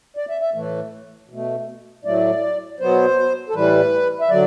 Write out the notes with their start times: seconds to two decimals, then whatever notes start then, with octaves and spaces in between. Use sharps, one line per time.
0.17 D5
0.30 E5
0.41 E5
0.54 A2 E3 A3
1.29 B2 A3
2.05 A2 F#3 A3 D5
2.80 B2 F#3 B3 C5
3.49 A4
3.55 A2 E3 G3 B4
4.21 E5
4.30 D3 F#3 D5